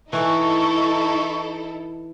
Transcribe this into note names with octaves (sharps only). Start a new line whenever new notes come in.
E3 D#4 E4 A4 C#6